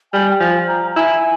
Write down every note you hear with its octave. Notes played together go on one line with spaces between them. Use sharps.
G3 G#5
G5
F3 G#5
A#5
E4 G#5